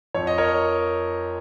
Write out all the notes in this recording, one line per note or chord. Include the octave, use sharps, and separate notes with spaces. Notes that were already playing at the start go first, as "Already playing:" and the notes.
F2 F3 C#5
D#5
A#4 C#5